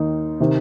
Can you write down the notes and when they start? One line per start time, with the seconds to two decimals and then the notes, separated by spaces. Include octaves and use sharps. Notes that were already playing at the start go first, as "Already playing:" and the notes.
Already playing: D#2 D#3 D#4
0.40 C3 D#3